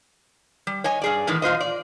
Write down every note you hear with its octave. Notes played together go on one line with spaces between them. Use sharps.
G3
C#5 D#5 G#5
G2 G#4 D5
E2 A2 D#3 E3 G#3
A#2 F4 C5 D#5
D5